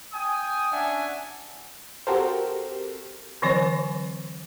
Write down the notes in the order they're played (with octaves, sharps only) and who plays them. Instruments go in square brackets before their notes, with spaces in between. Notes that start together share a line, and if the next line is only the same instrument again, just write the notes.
[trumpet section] G5 G#5 D#6
C#4 D4 E5 F#5 G#5
[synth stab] C4 F#4 G4 A4 A#4 C5
[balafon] D3 E3 F#3 C4 C5 C#5